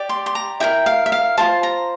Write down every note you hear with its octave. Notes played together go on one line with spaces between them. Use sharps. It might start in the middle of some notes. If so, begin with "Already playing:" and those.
Already playing: G4 D5
C6
C6
A#5
E4 G4 A#4 G5
F5
E5
F5
F4 A4 C5 A5
A#5